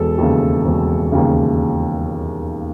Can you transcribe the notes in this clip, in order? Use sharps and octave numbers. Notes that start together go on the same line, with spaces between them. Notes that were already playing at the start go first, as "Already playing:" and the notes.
Already playing: E1 A4
D#2 C#3
E1
D#2 C#3